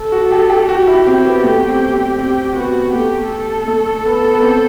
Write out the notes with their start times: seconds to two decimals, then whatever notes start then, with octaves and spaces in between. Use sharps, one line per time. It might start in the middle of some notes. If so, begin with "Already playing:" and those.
Already playing: A4
0.12 F#4
0.31 G4
0.50 G4
0.68 F#4 G4
0.87 E4
1.06 C4
1.25 B3
1.44 A3
1.68 C4
1.93 C4
2.18 C4 G4
2.56 B3 F#4
2.93 A3 G4
3.30 A4
3.68 A3
4.05 B3
4.34 B3
4.42 C4